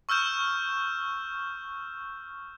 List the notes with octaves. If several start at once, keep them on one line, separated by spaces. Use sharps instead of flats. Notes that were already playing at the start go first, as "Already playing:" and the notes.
C#6 E6 F6 G6 E7